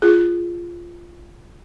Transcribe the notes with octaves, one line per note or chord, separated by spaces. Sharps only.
F4 G#4